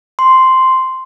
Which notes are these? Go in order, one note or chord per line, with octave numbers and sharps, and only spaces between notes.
C6